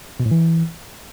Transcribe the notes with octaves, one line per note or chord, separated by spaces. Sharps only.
B2
A2
E3